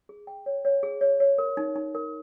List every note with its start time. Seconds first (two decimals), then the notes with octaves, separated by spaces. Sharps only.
0.09 G#4
0.27 G5
0.46 C#5
0.65 C#5
0.83 G#4
1.01 C#5
1.20 C#5
1.38 A#4
1.57 D#4
1.75 D#4
1.95 A#4